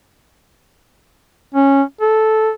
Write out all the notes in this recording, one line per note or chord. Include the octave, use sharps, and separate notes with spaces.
C#4
A4